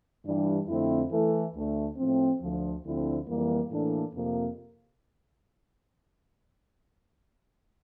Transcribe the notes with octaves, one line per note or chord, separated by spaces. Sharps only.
G2 E3 G3 D4
F2 D3 A3 C4 E4
E3 A3 E4 A4
D2 D3 A3
A2 F3 C4
D2 D3 F3
D2 D3 F3 C4 E4
F2 E3 G3 A#3
A2 E3 A#3 D4 A4
F2 C3 F3 A#3